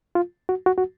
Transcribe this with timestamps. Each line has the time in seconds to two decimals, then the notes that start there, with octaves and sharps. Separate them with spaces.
0.15 F4
0.49 F#4
0.66 F#4
0.78 F#4